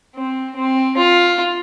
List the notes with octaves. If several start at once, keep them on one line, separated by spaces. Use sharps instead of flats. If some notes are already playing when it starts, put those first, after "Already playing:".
C4
C4
F4